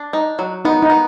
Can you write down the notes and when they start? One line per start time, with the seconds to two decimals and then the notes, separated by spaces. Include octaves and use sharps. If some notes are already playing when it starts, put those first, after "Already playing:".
Already playing: D4
0.13 D#4
0.39 F#3
0.65 B3 D#4
0.82 D#4
0.90 B3